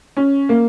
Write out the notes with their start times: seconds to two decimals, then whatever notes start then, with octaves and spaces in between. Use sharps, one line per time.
0.17 C#4
0.49 A#3